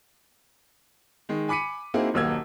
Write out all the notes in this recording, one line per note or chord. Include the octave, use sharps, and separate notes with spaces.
D#3 G#3
G#5 B5 D6 B6 C#7 D#7
A#3 C4 D#4 E4 F#4 G#4
D#1 B1 A#3 E6 G#6